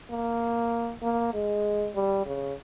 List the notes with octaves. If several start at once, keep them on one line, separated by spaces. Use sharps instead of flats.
A#3
A#3
G#3
G3
C#3